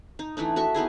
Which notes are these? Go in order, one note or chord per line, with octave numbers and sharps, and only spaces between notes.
D#4
E3 A3 D4 D#4
F#4 A4 E5 C#6
B3 D#4 E4 G#4